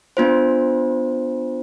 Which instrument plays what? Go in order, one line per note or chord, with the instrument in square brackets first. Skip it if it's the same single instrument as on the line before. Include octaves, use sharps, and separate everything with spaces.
[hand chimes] B3 D4 F4 C5